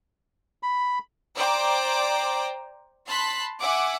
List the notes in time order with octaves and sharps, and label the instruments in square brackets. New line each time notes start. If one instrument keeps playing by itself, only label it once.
[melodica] B5
[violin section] C5 D5 G5 A#5 D6
A5 B5 C6 F#6 B6
E5 F#5 G#5 D6